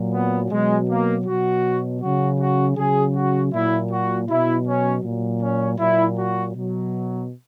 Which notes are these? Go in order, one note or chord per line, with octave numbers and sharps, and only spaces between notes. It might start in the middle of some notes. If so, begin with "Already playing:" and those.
Already playing: A#2 F#3
B3
B2 F#3 G#3
A#3
B2 F#3 F#4
C#3 F#3 F#4
F#4
C#3 F#3 G#4
F#4
A#2 F#3 E4
F#4
B2 F#3 E4
C#4
A#2
F#3
C#4
A#2 F#3 E4
F#4
B2 F#3